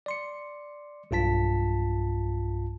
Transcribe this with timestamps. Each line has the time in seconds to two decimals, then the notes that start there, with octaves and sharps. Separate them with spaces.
0.06 D5 C6 C#7
1.11 B1 G2 F4 A5 B6